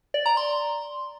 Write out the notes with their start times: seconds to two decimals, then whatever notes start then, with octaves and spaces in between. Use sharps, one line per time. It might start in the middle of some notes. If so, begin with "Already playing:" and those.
0.14 D5
0.26 A#5
0.37 C6